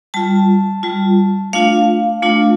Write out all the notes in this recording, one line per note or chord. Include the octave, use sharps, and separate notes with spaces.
G3 F4 A5
G3 F4
A3 D4 F4 F5
A3 D4 F4